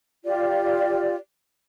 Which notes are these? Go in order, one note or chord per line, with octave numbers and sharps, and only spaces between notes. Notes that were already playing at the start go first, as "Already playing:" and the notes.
F4 G4 D5